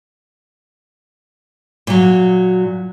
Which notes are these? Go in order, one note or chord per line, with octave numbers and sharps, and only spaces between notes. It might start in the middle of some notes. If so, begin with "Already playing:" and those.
A#2 F#3